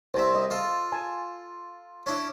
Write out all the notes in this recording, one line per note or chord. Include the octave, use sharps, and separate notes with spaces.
C2 C3 C5 E5
D#5
F4 A4
G#5 A5
C#4 D4 E4